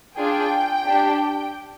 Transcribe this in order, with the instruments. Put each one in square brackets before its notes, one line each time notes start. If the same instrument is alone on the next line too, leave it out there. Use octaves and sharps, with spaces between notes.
[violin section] D4 F4 G#4 G5
D4 G4